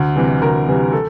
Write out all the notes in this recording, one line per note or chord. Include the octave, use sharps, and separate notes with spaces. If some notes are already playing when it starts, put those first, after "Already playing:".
Already playing: D2
C3 E3 G3
D2 A#4
C3 E3 G3
A4